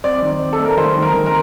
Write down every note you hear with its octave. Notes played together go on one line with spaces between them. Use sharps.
C4 D5
D#3
C4
A4
A3
A#4
D#3 C5
D#3
A#4
D#3
A#4